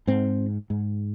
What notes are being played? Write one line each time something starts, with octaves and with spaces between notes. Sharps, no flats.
G#2 C4
G#2